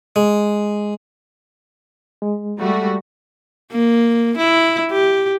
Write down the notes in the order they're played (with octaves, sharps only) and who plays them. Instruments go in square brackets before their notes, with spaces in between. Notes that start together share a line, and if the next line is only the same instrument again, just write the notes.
[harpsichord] G#3
[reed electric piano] G#3
[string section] G3 A3 F#4
[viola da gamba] A#3
E4
G4